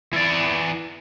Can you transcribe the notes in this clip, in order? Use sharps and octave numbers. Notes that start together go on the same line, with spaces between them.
E3 D5